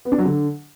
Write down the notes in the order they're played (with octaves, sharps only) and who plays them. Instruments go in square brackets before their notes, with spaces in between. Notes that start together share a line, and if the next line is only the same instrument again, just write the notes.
[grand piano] B3
D4
F#3
D3